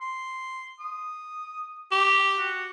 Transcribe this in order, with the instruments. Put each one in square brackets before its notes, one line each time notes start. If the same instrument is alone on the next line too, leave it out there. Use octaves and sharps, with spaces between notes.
[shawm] C6
D#6
[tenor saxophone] G4
[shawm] F#4